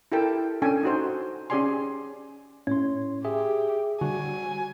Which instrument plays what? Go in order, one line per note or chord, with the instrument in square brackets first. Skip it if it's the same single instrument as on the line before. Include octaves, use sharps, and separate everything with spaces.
[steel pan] E4 G4 A4 A#4 G5 A5
C#4 D4 A4 G5 G#5
D#4 F#4 C5
C#4 G4 G#4 D5 G#5 C6
[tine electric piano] A2 C#5 C6 [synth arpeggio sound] C#4
[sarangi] G4 [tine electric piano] G#4 E5
[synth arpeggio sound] D3 [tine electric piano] G3 F#4 [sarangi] G#5